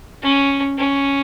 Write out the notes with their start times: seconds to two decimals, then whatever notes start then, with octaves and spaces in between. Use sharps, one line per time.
0.22 C#4
0.78 C#4